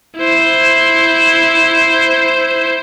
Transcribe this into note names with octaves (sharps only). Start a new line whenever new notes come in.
E4 C5